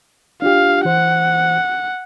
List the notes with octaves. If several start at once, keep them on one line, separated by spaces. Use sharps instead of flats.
D4 F4 G4 F5
E3 C5 F#5